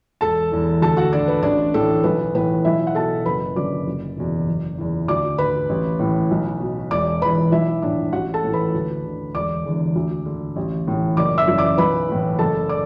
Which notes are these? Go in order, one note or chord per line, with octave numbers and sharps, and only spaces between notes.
E1 A4 A5
E2 E3
D2 A4 A5
F#4 F#5
D3 D4 D5
B4
A1 D4 D5
A2 E3 A4
B1 B4
A2 E3 B4
B1 E4 E5
F#5
B2 A4 A5
F#1 B4 B5
F#2 D3 D5 D6
F#1
E2 B2
F#1
E2 E3
D2 D5 D6
D3 B4 B5
A1
A2 E3
B1
B2
E1 D5 D6
E2 E3 B4 B5
B1 E4 E5
A2 E3 D4 D5
A1 F#4 F#5
A4 A5
A2 E3
B4 B5
D2
D3
E1 D5 D6
E2 D3
D2
D3
A1
A2 E3
F#1 D5 D6
E5 E6
F#2 E3
D5 D6
B1 B4 B5
A2 E3
F#1 A4 A5
D5 D6